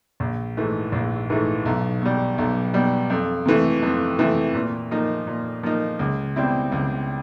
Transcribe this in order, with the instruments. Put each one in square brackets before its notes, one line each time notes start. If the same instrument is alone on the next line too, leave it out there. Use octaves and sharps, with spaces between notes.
[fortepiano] A#1
G#2 E3 A3
A#1
G#2 E3 A3
B1
B2 G3
B1
B2 G3
F2
C3 E3 A3
F2
C3 E3 A3
A#2
F3 A#3 D#4
A#2
F3 A#3 D#4
C#2
B2 G3 C4 E4
C#2